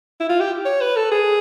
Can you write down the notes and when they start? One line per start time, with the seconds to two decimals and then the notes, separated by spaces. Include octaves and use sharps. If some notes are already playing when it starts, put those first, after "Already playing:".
0.21 E4
0.30 F4
0.40 G4
0.65 C#5
0.81 B4
0.96 A4
1.12 G#4